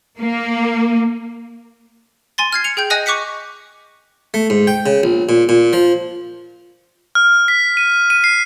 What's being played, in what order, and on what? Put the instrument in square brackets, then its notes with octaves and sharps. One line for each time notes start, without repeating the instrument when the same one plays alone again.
[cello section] A#3
[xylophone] G#5 C6 A6
F6 G#6 C7
C#7 F7
G#4 G5 G6
D#5 G#5 D#6 F#6 A#6
C#6 D6 F#6 B6 C#7
[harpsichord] A3
G#2
G5
C#3
A#1
A#2
A#2
F3
[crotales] F6
B6
D#7
D#7
C7